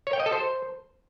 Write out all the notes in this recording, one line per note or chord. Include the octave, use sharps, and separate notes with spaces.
C#5
G5
D#5
A4
C5